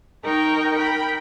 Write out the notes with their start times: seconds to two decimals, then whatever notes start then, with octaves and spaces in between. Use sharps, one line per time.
0.25 D#4 A#4 G5 A#5 C#6
0.77 A#4 G5 B5